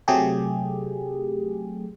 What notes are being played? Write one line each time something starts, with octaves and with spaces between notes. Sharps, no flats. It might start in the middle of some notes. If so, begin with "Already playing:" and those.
C3 F#3 A3 G4 G#4